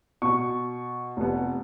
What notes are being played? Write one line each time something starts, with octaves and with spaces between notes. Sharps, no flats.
B2 C#6
F1 B3